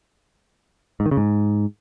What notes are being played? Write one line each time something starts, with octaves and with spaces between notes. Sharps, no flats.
G#2
D#3
C#3
G#2